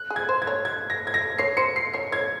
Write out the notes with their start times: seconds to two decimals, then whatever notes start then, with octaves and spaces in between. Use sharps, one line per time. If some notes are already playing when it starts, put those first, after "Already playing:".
Already playing: F#6
0.10 G#4
0.16 G#6
0.29 C5
0.42 G#6
0.47 C#5
0.65 G#6
0.90 A#6
1.07 G#6
1.14 A#6
1.38 C#5 C7
1.57 C5 C#7
1.76 C7
1.94 C#5 C7
2.12 C#5 G#6